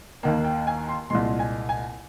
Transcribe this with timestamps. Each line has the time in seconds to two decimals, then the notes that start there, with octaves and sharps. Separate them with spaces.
0.23 D#2 D#3 A#3 G5
0.45 G5
0.67 G#5
0.89 C6
1.10 C2 A#2 G#3 C6
1.39 G#5
1.69 G#5